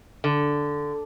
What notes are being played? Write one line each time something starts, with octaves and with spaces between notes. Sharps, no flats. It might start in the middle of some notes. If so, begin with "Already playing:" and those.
D3